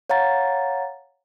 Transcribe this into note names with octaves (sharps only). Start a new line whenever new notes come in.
C#5 F5 F#5 A#5 A6